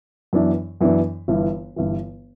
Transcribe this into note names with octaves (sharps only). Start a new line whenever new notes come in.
F#2 E3 B3 D4
F#2 E3 B3 D4
G1 G2 E3
G1 G2 E3